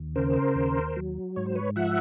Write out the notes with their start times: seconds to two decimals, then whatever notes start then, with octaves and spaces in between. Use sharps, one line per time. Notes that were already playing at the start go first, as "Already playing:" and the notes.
Already playing: D#2
0.16 C#3 A#4 C5
0.55 D#2
0.96 F#3
1.36 G#2 C#5
1.46 C5
1.55 B4 C#5
1.76 F3 E5 F#5